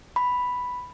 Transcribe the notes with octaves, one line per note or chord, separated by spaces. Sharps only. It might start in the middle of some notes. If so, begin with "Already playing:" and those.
B5